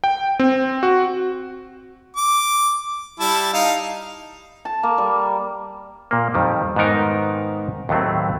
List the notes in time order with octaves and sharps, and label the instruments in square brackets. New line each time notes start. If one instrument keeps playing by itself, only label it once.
[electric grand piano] G5
C4
F#4
[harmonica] D6
G3 E4 A5
D#4 F5
[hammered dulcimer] A5
A#3
G3
[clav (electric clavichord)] A#2 A#3
F2 D#3 G3
G#2 D#3 B3 D#4 A#4 C5
D#2 A2 F#3 A3 C4